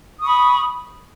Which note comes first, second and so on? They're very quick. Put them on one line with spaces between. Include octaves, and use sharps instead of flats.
D#6 C#6 B5